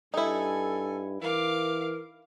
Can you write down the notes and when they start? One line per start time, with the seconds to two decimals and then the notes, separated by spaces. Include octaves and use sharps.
0.14 G2 D#4 E4 A4 G#5
1.21 E3 A#4 F5 D6